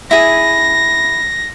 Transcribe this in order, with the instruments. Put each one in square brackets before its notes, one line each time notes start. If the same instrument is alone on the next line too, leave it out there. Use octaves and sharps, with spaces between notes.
[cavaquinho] E4 G#4 [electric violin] A#6